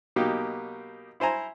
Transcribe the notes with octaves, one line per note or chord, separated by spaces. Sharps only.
B2 F#3 A#3 D#4 G4
E4 C5 G#5 A#5